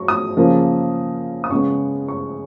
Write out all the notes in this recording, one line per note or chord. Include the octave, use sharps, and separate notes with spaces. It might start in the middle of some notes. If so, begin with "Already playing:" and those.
Already playing: F#3 C#6
D#6
C#3 F3 A#3
D#6
C#3 G#3 B3 C#6
C#6